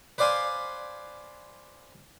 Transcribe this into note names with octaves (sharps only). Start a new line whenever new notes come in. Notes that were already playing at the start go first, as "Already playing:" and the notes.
B4 C5 D5 F5 G#5 C6